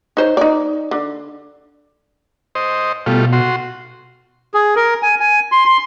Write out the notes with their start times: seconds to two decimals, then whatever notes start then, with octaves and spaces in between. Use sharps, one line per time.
0.17 D#4 C5 C#5
0.37 D#4 D5
0.91 D3
2.55 C5 D#5
3.06 B2 G3 A3 F4
3.33 F#4 C6
4.54 G#4
4.76 A#4
5.03 G#5
5.20 G#5
5.52 C6
5.66 C6